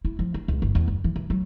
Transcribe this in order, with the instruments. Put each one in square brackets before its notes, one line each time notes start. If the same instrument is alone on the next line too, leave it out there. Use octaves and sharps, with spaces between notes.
[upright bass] E4
F3
D4
C#2
G1
E2
F#1
E3
E3
F#3